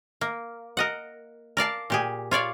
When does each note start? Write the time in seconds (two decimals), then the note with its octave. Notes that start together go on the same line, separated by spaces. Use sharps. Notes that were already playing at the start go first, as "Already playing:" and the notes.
0.21 A#3
0.77 A#4 D#5 F#5
1.57 A#4 D5 F5 A5
1.90 A#2 G4 G#4
2.31 F4 C#5 D5 F5